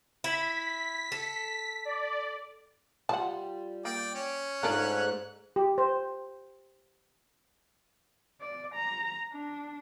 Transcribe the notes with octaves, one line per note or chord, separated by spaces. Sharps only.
E4 B6
A4
D5
G3 F4 F#5 A5
A#3 D5 G5
C#4
G#2 A3 D4 F4 A4 A#4 F#6
G4
C5
D5
A#5
D4